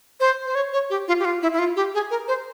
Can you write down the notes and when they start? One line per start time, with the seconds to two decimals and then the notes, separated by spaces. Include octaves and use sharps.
0.20 C5
0.46 C5
0.55 C#5
0.73 C#5
0.90 G4
1.08 F4
1.19 G4
1.25 F4
1.42 E4
1.53 E4
1.59 F4
1.76 G4
1.94 G#4
2.11 A#4
2.28 C5